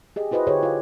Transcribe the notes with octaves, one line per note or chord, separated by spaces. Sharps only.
G4 G#4 D#5
E4 F#4 B4 C5 D#5
D3 G4 G#4 B4 C#5
F4 F5